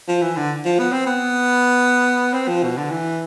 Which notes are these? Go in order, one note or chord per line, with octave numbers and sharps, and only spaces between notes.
F3
E3
D3
F3
B3
C4
B3
C4
F3
B2
D3
E3